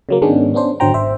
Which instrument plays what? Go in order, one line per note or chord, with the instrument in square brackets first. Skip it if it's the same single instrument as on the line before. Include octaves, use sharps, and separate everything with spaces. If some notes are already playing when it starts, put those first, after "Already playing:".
[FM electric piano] C#3 F#3 A#3
G#2 D#3 G#3 B3 C#4 D4
B3 C#4 D4 C5
G#1 D3 F#3 C5 G5 A#5
G#1 C5 E5